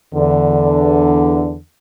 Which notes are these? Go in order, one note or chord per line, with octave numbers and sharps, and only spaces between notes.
E2 D3